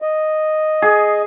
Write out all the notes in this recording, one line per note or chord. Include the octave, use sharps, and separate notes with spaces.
D#5
G#4